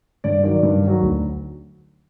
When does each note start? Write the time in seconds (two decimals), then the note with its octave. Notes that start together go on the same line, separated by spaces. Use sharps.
0.24 G2 D5
0.43 D#3 F#3 D5
0.63 G2
0.82 D#3
0.87 F#3
1.02 D2